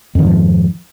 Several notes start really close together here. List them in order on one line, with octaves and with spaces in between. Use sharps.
F2 D#3 G#2 F3